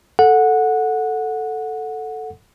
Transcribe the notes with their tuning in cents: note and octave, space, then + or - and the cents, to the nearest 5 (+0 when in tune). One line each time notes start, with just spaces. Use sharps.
A4 +0 F#5 -15